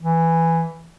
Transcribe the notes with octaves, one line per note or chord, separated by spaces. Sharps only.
E3